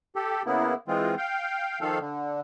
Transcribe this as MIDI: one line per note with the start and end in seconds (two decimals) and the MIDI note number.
0.16 0.42 67
0.16 0.42 69
0.46 0.74 49
0.46 0.74 58
0.46 0.74 59
0.46 0.74 64
0.88 1.15 52
0.88 1.15 56
0.88 1.15 60
0.88 1.15 65
1.17 1.79 77
1.17 1.79 79
1.81 1.99 51
1.81 1.99 53
1.81 1.99 69
1.81 1.99 77
2.00 2.40 50